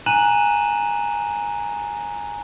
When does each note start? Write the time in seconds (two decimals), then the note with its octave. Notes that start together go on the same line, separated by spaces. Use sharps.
0.06 G#5 A#5 F#6 D#7 E7 F#7